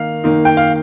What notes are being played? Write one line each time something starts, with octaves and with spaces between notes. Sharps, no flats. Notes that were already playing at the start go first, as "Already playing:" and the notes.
Already playing: D#3 A#3 D#4 F5
D#3 A#3 D#4
G5
F5